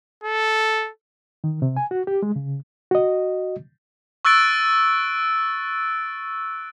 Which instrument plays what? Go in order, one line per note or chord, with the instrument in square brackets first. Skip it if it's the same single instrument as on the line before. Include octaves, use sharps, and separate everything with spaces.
[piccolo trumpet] A4
[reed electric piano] D#3
C3
G#5
F#4
G4
G#3
C#3
F#4 D#5
[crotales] C#6 E6 F#6 A6 D7